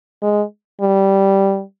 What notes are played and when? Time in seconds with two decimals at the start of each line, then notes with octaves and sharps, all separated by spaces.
0.22 G#3
0.81 G3